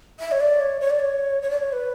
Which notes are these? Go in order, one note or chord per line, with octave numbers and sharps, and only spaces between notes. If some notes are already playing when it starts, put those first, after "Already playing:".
E5
C#5
D5
C#5
C#5
D5
C#5
C#5
D5
C#5
B4